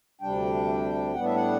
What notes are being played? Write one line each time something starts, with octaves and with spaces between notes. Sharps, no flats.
D2 C3 G3 D4 G5
A2 G3 B3 D4 F#5
E5
F#5